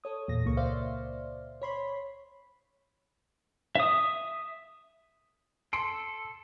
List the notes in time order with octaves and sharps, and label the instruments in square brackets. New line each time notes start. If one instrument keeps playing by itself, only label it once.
[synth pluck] A4 C#5 D#6
E2 A#2 A#6
C#2 A#3 C#6
C5 D5 E5 F5
C#5 B5 C6
[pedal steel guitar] E5 D#6
[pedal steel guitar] A4 [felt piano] C6 C7 D7